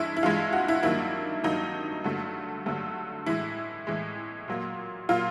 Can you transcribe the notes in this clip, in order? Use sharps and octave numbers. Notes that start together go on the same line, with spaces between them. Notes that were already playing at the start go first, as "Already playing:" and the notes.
Already playing: G2 E3 G#3 E4
E4
G2 E3 G#3 F4
F#4
E4
G2 D#3 F#3 A#3 E4
G2 D#3 F#3 A#3 D#4
G2 D3 F#3 A3
G2 D3 F#3 A3
A2 E3 G#3 E4
A2 E3 G#3
A#2 F#3 A#3
A#2 F#3 A#3 F4